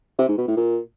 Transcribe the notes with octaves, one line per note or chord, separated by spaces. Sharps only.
C3
G#2
B2
A2
A#2